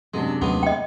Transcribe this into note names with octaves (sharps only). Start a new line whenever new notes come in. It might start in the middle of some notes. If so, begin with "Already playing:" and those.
F#2 C3 G#3 D4
D#2 F#3 G#3 A3 B3 F4
D#5 G5